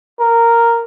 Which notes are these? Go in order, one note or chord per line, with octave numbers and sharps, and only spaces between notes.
A#4